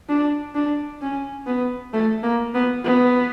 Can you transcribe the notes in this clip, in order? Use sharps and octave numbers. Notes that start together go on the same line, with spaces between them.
D4
D4
C#4
B3
A3
A#3
B3
B3